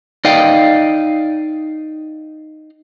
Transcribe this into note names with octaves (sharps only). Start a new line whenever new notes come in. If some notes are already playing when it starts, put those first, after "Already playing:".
D#4 D5 D#5 F5 G5